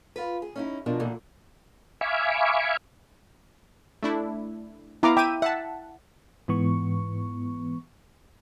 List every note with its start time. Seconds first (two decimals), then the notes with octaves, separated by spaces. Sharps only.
0.16 F4 B4
0.42 G#4
0.56 C#4 D#4 E4
0.86 B2 F3 D4 A#4
1.00 A#2 D3 E3
2.01 E5 F5 G#5 B5 C#6 D6
4.03 A3 D4 E4
5.03 B3 E4 F5 A#5 D6
5.17 E5 G5 D6 D#7
5.42 E5 F#5 A5
6.48 G#2 E3 B3 C#6